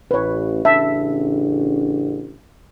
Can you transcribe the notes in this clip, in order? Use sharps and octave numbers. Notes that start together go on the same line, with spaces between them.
A1 B4 C#5
A1 C#3 D4 E5 A5